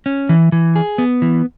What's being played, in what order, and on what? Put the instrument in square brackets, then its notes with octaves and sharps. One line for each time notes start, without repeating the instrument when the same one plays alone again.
[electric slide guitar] C#4
E3
E3
G#4
B3
E3